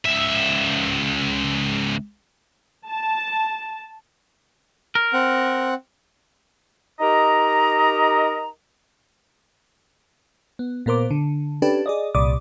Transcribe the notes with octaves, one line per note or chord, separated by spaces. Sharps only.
C#2 E5
A5
A#4
C4 F#5
D#4 G4 A#4 D#5 A#5
B3
A#2 B3 A#4 C5 D6
D3
C#4 D4 G4 A4 B4
G#4 D5 D#5
C2 A#2 D5 D6 D#6